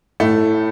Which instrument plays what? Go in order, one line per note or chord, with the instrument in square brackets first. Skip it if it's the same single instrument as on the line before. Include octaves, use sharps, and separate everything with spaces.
[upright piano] A2 [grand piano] A3